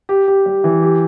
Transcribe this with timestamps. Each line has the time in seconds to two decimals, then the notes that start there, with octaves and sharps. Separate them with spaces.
0.09 G4
0.28 G4
0.46 G3
0.64 E3
0.82 G4